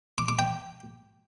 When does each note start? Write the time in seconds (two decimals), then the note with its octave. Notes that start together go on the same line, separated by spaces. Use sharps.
0.18 D6
0.28 D6
0.39 G5